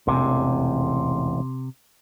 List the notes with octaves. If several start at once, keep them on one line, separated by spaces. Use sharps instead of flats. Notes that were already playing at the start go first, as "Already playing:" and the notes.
E1 A1 F2 C3